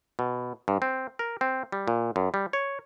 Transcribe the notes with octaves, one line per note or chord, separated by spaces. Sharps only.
B2
G2
C4
A#4
C4
G3
A#2
F#2
G3
C#5